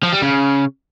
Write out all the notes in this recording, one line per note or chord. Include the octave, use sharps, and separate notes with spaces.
F3
G3
C#3